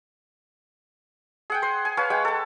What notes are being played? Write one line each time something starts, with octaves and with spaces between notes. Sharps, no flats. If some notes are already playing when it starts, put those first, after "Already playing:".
G#4 F#5 G5
C5 C6
G#5
B4 C#5 F5 G#5
G#3 F#5 G5
A4 A5